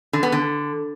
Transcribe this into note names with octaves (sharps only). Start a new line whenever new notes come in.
D3
B3
D3